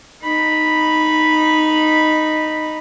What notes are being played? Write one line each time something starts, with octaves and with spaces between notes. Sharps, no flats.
D#4 B5